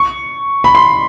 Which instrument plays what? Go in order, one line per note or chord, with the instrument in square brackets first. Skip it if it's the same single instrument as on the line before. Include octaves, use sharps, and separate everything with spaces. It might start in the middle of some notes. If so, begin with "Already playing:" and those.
Already playing: [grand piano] C#6
B5
C6